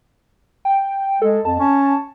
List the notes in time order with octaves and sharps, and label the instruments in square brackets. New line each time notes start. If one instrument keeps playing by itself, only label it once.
[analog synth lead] G5
[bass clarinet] G#3 [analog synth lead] A4
[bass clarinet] F2 [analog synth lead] A5
[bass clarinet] C#4